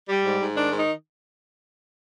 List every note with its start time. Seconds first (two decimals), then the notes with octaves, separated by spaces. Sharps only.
0.09 G3
0.24 G#2
0.40 G#2
0.55 D#3 D4
0.71 G#2
0.76 D#4